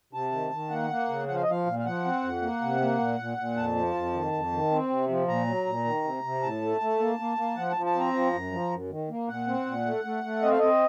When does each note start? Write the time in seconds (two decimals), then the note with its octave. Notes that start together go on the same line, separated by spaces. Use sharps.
0.13 C3 A5
0.32 D#3
0.52 D#3
0.70 A#3 F#5
0.90 A#3
1.09 C#3
1.28 F3 F#5
1.35 F5
1.43 D#5
1.47 F3 F5
1.66 A#2
1.79 F5
1.85 F3 F#5
2.05 C4
2.23 F2
2.42 A#3
2.61 C3
2.80 A#3
2.99 A#2
3.19 A#2
3.38 A#2
3.56 F2 A5
3.75 F3
3.94 F2
4.13 D#3
4.32 F2
4.52 D#3
4.71 C4
4.89 C3
5.09 F3
5.28 A#2 A#5
5.47 F#3
5.66 A#2
5.85 D#3
6.04 C3
6.23 C3
6.42 A2 A5
6.62 A3
6.81 A3
6.99 A#3
7.19 A#3
7.37 A#3
7.56 F3 F#5
7.71 A5
7.76 F3
7.86 A5
7.95 C4 A#5
8.13 F3
8.33 F#2
8.52 F3
8.71 F#2
8.90 D#3
9.10 A#3
9.28 A#2 F#5
9.47 C4
9.66 A#2
9.86 A3
10.04 A3
10.24 A3
10.42 C4 D#5
10.51 F5
10.59 C4 D#5